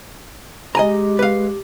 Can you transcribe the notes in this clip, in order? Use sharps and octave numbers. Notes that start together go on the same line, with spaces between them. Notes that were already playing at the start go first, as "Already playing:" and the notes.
G#3 G4 D#5 G#5 A#5
B4 F5